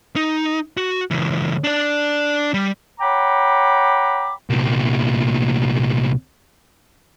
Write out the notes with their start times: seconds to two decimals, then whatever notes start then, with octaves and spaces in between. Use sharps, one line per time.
0.16 D#4
0.77 F#4
1.11 C#2 E3
1.64 D4 D5
2.54 G3
3.00 C#5 F#5 G5 A#5 B5 D6
4.50 C2 A#2